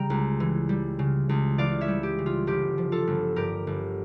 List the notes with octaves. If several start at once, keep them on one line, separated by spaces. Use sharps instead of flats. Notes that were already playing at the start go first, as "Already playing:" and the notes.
Already playing: C#3 G3 G5 A#5
C#2
E3
G3
C#3
C#2
E3 D5 F5
C#5 E5
G3
G4
C#3
F4
G1 G4
F3
F4 A4
G1
G2 G4 A#4
G1